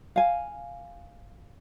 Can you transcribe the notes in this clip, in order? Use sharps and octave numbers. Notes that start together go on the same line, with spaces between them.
F5 G#5